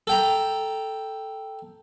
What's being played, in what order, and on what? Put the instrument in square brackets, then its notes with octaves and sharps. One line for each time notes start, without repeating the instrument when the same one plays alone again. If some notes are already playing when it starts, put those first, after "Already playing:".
[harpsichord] A4 G5 A#5